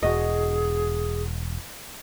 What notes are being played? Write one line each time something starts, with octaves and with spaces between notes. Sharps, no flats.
E1 F#4 G#4 D#5